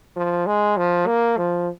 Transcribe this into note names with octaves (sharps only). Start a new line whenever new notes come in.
F3
G#3
F3
A#3
F3